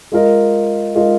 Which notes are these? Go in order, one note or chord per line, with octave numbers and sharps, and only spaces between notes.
G#3 F4 A#4 D#5
G#3 F4 A#4 D#5